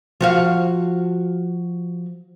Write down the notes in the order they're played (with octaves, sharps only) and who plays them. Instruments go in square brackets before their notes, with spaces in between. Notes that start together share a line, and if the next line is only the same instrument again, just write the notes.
[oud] F3 F#4 F5